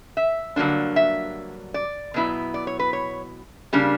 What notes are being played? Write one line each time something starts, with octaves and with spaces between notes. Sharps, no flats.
E5
G2 D3 F#3 A#3 D4
E5
D5
B2 F#3 B3 E4
D5
C#5
B4
C#5
C#3 G3 A#3 D4